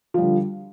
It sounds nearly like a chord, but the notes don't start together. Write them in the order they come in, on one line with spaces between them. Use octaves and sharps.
F3 G3 D3